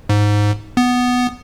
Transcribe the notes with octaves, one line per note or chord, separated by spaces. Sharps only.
G#2
B3